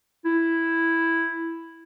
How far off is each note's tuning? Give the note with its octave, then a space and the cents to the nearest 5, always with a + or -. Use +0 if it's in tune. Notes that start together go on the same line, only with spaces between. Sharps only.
E4 +0